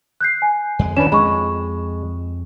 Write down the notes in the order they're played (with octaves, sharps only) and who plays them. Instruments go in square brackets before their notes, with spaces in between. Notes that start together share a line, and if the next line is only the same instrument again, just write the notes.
[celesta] F#6 G6 C7
G#5
[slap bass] F2 G#3
[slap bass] D#3 E3 [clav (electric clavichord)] C#4 D4 B4 [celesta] E7
[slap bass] F2 [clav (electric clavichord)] G#3 [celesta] B5 C#6